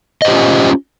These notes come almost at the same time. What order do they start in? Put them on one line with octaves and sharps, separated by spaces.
D#5 C5 G4 F4 C#4